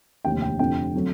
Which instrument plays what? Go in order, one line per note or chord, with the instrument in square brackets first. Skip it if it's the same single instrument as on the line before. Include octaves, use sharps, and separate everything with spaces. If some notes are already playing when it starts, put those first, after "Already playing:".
[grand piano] F1 D#2 D3 G5
G5
F1 F2 D3 G5
D3 F#3 A3 C4